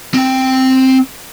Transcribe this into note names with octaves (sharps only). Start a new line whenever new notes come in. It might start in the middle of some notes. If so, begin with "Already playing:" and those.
C4 G5